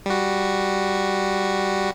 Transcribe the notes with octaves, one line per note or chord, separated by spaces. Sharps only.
G3 F#4